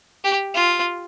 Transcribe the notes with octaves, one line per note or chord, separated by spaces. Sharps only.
G4
F4